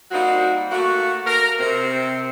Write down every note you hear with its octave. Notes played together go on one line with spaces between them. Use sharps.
G3 A#3 C4 D#4 F#4
A3 A#3 F#4
A#4
C3 C4